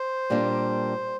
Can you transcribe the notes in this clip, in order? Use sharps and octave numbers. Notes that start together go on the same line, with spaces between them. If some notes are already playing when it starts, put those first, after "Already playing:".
Already playing: C5
A#2 G3 A#3 D4